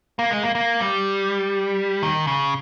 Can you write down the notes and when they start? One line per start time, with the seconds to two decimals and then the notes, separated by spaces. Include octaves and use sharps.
0.19 A#3
0.31 G#3
0.43 A#3
0.55 A#3
0.80 G3
2.03 D#3
2.27 C#3